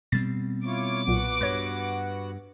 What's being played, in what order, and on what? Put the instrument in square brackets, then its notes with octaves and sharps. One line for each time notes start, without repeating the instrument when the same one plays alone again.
[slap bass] B2 G3 C4 [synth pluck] A6 B6 C7
[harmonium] E4 F4 C#5 [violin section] D6
[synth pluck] B1 A#2 [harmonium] B3 F#4 F#5
[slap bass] G2 [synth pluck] B4 C#5